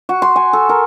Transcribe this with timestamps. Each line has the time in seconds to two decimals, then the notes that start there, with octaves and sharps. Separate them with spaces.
0.09 F#4
0.22 C6
0.36 G#5
0.53 A4
0.69 A#4